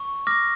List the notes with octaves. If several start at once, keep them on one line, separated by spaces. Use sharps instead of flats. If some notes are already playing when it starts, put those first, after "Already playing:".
Already playing: C#6
D6 F6 A#6